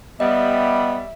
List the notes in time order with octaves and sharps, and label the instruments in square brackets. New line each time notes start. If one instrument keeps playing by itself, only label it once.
[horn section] G3 [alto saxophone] B3 [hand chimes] D#5 [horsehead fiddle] E5